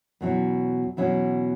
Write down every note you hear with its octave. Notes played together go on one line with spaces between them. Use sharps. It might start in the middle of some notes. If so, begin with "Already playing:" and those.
E2 B2 F#3 C#4 E4
E2 B2 F#3 C#4 E4